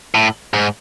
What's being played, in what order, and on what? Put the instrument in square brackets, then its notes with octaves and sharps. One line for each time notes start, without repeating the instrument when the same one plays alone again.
[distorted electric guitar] A2
G#2